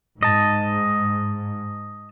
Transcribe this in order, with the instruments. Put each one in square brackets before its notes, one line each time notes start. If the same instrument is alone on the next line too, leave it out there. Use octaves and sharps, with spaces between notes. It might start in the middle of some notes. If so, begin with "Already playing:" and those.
[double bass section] G#2 [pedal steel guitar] D#5 A5